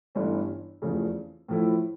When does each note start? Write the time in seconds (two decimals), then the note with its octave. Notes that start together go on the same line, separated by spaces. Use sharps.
0.15 G1 G2 E3 A3 C#4
0.82 F1 E2 C#3 F3 A3
1.48 A2 F3 A3 E4